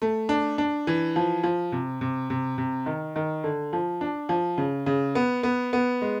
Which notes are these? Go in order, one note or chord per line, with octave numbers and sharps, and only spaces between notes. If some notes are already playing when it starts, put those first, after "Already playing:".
A3
D4
D4
E3
F3
F3
C3
C3
C3
C3
D#3
D#3
D3
F3
D4
F3
C#3
C#3
B3
B3
B3
G#3